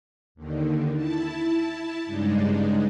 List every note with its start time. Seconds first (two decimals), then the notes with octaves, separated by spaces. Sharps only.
0.35 D#2 D3 D#3
0.95 E4 A5
2.05 G2 C#3 G#3 D4 D#4